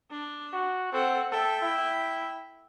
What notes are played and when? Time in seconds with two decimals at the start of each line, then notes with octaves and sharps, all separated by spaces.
0.11 D4
0.53 F#4
0.92 C4 A4 F#5
1.32 A4 E5 G5
1.63 E4